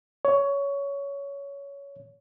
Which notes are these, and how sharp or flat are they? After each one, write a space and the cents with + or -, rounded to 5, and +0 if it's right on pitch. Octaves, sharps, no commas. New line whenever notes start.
C#5 +15